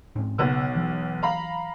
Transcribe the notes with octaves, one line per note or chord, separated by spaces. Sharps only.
G#2 C4 C#4
B1 C#3 B3 E6
E3 F#3
F5 A#5 B5